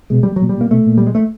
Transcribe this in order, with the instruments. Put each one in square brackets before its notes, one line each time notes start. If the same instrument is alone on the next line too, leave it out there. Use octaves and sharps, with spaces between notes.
[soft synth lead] B2 [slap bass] G#3
[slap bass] G3
F#3
[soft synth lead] A#2
[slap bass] G3
[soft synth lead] A#2
[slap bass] A#3
[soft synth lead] B2 [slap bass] A3
[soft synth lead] A#2
[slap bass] G3
G#3
A3